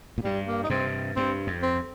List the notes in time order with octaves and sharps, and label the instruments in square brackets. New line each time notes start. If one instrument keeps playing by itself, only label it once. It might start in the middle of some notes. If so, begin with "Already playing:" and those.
[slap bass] A#2
[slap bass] G2 [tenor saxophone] G3
[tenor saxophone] A#3
D#4
[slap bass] G2 C3 [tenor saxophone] C4
[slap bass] G2 [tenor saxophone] C4
[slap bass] F2
[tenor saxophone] C4